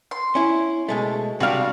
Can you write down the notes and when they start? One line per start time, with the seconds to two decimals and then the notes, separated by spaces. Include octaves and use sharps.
0.11 C6
0.35 C#4 E4
0.89 B2 G#3 A3
1.40 C3 G3 D4 F#4 F5